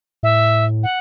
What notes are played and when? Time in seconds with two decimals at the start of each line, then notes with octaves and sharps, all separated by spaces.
0.23 A2 E5
0.83 F#5